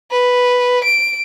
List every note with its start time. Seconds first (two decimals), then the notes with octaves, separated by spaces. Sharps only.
0.11 B4
0.84 D7